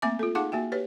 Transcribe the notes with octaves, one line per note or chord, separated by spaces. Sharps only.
A3 A#3 C4 E5 G#5 D6
F4 A4
D#4 G#4 F5 F#5 A5 D6
A#3 F#4 E5 G5
G4 B4 C#5